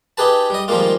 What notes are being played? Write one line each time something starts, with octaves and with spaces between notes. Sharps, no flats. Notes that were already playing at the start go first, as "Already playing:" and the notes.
D#4 G4 G#4 B4 A5
G3 D#5
D#3 F3 G3 G#3 A#3 F4